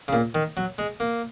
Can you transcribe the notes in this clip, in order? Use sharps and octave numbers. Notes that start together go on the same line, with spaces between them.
C#3
A#2
D#3
F#3
G#3
A#3